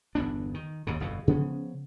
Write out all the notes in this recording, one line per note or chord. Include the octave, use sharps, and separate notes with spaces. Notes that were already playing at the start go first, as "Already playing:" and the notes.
G1 E2 B3 D4
D#3
D#2 G#2 C#3
G1 F2 B2
C#3 F3 B3 C#4